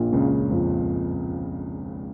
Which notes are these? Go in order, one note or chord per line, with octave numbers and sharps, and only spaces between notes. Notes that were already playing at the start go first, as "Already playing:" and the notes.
Already playing: A#1 A#2
C#2 C#3
F2 F3